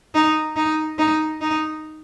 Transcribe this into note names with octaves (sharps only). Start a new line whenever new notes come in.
D#4
D#4
D#4
D#4